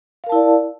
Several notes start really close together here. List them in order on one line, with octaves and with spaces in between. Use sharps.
F5 A#4 A5 E4 D5